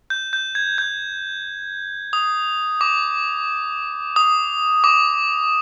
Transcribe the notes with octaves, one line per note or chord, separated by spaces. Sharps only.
G6
G6
G#6
G6
D#6
D6
D#6
D6